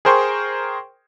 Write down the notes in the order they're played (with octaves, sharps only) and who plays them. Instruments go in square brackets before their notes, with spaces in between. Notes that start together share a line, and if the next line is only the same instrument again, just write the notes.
[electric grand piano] G#4 A#4 C5 G5 C6 C#6